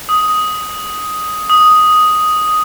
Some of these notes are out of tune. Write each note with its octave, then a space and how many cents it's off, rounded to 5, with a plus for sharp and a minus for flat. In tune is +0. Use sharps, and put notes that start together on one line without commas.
D#6 +5
D#6 +0